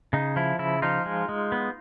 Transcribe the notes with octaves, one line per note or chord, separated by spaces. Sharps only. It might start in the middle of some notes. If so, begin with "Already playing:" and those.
C#3 D#4
F3 E4
C#3 E4
F3 D#4 F4
G#3
G#3
B3